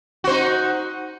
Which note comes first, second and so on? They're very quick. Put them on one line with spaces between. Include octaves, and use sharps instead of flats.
F#4 C5 D#4